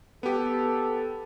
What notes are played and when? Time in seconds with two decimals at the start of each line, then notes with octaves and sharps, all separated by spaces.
0.23 B3 G4 A4